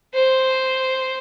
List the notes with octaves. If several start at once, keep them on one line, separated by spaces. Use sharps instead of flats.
C5